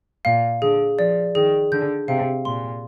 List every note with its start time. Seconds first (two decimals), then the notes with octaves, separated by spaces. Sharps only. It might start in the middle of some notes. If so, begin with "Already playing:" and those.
0.25 A#2 F5
0.62 D3 G#4
0.98 F3 D5
1.35 D#3 G#4
1.72 D3 G6
2.08 C3 F5
2.45 A#2 C6